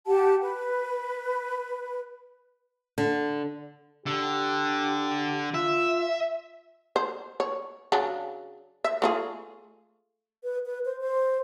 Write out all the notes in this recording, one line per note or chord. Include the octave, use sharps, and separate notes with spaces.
G4 F#5 A5
B4
D3
D3 G4
F4 E5
C5
C#5
C#3 F#3 D4
E5
A3 F4 G#4
B4
B4
C5
C5